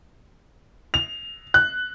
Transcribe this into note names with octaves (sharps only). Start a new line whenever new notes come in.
F7
F#6